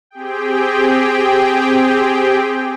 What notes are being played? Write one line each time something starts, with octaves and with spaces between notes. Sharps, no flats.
C4 G4 G#4 G5